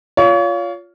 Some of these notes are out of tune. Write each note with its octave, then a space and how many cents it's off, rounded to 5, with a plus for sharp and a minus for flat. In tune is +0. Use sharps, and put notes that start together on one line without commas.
F4 +0 C#5 +35